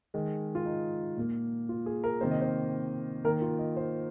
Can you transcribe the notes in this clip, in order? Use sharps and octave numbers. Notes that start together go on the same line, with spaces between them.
D#3 G#3
F4
D#4
A#2 A#3
F4
G#4
A#4
C3 D#3 A#3 C5
D#5
C5
D#3 A#3 A#4
F4
D#5
C5